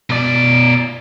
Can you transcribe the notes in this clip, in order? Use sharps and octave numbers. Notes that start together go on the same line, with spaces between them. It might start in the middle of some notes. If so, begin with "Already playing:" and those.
B2 D5